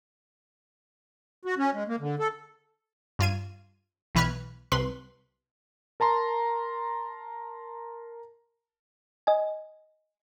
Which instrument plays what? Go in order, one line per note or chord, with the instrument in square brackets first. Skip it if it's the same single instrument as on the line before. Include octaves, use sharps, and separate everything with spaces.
[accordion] F#4
C#4
G#3
A#3
D3
A4
[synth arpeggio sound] G2 F4 G#6 D#7
B1 E3 B4 F6 F#6 G#6
C2 B4 C6 B6
[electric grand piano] A#4 A5 A#5 C6
[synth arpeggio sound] D#5 G#5